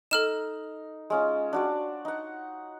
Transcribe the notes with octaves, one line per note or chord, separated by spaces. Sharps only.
D#4 A4 F6 E7
G#3 C#4 F4
D4 F#4 D5
D#4 F#5